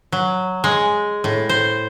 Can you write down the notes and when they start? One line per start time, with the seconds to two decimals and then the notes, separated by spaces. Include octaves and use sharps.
0.12 F#3
0.64 G#3
1.24 A2
1.49 C5